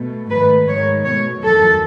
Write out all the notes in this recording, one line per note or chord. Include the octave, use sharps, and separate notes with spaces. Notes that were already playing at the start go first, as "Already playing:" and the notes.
Already playing: B2 A3
G#2 D#3 A3 B4
G#2 D#3 G#3 C#5
B2 A3 C#5
E2 D#3 F#3 A4